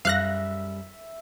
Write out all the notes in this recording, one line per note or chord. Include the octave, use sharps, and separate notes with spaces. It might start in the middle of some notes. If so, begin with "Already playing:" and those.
F#2 G3 E5 F5 F#6 A#6